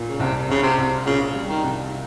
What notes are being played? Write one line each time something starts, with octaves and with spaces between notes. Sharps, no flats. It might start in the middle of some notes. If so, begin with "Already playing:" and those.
Already playing: A#2
C#3
C2 C3
C2 C#3
C3
C2
A#2 C#3
G3
D#3
C2